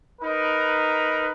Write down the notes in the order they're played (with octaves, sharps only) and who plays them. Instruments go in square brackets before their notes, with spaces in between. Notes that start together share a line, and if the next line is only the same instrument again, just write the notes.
[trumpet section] D#4 A#4 B4